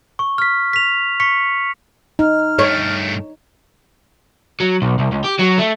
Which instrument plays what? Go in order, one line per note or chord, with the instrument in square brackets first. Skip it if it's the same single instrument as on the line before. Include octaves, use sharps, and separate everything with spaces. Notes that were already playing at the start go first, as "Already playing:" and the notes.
[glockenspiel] C#6
F6 B6
B6 F7
C#6 B6 C#7
[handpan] D#4 [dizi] F6
[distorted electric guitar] G2 A3 [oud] C#5
[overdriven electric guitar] F#3
B1
C2
C#2
G4
F#3
A3